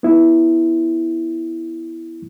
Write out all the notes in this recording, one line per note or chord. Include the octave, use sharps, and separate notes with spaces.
B3 E4